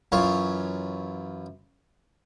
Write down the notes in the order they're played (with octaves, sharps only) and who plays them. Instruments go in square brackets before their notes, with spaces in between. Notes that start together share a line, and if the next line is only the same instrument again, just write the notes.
[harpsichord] F#2 E3 F4 C#5